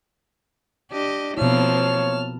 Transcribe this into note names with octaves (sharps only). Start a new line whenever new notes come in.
D4 G4 D#5
B2 F3 A#3 C4 E4 C#5 A5 F6